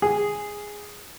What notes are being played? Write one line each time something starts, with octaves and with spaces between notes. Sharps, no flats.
G#4